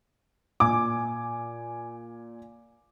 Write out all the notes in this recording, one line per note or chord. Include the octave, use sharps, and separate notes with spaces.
A#2 G#5 D6